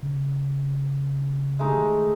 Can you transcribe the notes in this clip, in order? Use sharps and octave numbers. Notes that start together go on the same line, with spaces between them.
C#3
G#3 A3 D#4
D#3